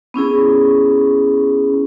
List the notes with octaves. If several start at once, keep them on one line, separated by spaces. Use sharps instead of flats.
B3 C#4 E4 G#4